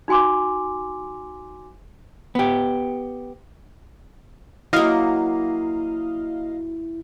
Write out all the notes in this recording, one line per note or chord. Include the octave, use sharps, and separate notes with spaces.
D#4 F#4 G#5 C6 D6
B3 G4
F#3 A#3 E4 D#5 F5